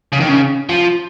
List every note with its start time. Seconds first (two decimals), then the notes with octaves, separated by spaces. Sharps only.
0.13 C#3
0.20 D#3
0.29 C#3
0.69 F3